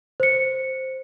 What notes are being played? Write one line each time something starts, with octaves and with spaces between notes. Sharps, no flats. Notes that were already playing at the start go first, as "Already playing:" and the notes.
C5 C#7